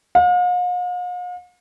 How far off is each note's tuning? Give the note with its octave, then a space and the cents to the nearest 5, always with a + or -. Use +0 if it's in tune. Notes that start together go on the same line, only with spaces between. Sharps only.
F5 +45